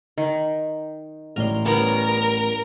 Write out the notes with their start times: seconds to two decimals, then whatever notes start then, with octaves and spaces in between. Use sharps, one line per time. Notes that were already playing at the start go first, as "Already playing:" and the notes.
0.18 D#3
1.36 A1 A2 A#4 D5 C6
1.66 G3 B3 C#4 A#4